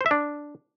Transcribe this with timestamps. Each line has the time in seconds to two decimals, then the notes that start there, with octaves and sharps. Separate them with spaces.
0.01 C5
0.06 E5
0.11 D4